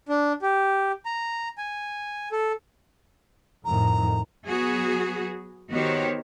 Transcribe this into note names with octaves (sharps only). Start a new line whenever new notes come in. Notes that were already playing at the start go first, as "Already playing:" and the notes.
D4
G4
A#5
G#5
A4
F2 A2 D#3 A#5
F#3 B3 F#4 G#4
D#3 B3 F#4 G4 C5 C#5